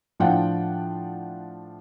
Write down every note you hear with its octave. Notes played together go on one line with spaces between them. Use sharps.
A2 F3 D4 F4 F#5 G5